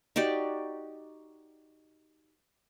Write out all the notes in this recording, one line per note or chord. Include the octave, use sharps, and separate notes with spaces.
D#4 F#4 G4 D5